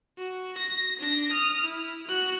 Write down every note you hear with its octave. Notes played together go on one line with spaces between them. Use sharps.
F#4
A#6
D4 A#6
D#6 F6
E4
F#4 F#6